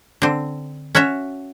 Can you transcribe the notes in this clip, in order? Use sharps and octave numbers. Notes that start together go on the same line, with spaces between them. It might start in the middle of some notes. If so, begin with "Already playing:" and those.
D3 C4
C#4 F#4 C#5 E5